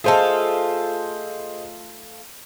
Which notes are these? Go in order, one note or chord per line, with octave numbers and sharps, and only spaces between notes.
A3 F4 G#4 A4 C5 D#5